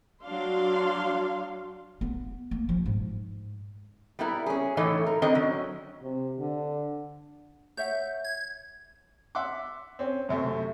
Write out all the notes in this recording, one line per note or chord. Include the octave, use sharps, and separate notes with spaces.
F#3 D4 F5 C6
B3
A#3
F3
G#2
G3 B3 E4 A#4
C#4 G#4
F#2 A2 E3 D#4 A4 C#5
A#4
A2 D#3 C4 D4 C5 D#5
F#3 C#4
C3
D3
C#5 E5 F#5 G6
G#6
E5 F#5 C6 D6
C4 C#4
F#2 C3 A3